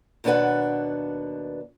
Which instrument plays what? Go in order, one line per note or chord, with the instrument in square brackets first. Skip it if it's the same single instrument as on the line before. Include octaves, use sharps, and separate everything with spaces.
[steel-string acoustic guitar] D#2 B2 D4 F#4 B4 F#5